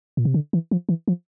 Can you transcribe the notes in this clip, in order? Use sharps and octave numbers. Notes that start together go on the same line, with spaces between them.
A#2
C3
D3
E3
F3
E3
F3